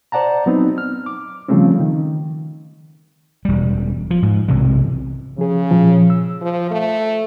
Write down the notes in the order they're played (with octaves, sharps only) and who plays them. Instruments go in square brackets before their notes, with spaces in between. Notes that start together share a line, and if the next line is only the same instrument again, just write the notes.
[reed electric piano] C5 D5 F#5 A5 A#5
F#3 B3 C4 D#4
F6
D6
C#3 F3 G3 A3 C4 C#4
D#3
[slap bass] E1 G3
F3
G#2
B1 C3 E3 G#3
[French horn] C#3 [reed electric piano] F3 G#4
[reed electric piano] A#2 F3
E6
[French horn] F3
A3